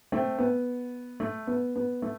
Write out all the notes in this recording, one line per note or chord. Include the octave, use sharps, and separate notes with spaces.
A3 C4
B3
A3
B3
B3
A3